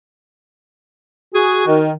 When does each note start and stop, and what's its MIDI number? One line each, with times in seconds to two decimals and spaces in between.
1.34 1.80 66
1.34 1.63 68
1.67 1.91 51